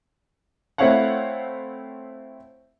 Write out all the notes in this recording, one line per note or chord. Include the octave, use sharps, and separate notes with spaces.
A3 C4 E4 C#5 F5 F#5